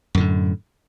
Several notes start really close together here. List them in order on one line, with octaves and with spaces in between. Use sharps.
F#2 D3 A2